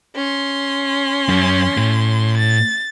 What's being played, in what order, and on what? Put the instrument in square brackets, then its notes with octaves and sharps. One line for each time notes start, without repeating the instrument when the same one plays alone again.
[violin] C#4 C6
[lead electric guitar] F#2
A2
[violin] A6